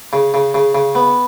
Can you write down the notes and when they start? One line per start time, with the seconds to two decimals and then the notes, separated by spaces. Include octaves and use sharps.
0.13 C#3
0.34 C#3
0.54 C#3
0.75 C#3
0.95 B3